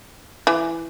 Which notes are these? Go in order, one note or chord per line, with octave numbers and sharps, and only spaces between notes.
E3